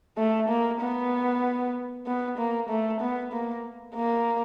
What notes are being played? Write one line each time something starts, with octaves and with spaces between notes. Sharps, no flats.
A3
A#3
B3
B3
A#3
A3
B3
A#3
A#3